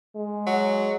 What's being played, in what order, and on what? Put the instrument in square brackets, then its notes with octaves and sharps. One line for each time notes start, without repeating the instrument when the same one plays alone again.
[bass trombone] G#3
[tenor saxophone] F#3